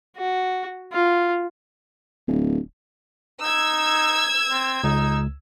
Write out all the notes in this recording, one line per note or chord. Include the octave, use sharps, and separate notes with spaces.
F#4
F4
D1
D#4 E6 G#6
C4
C#2 D#4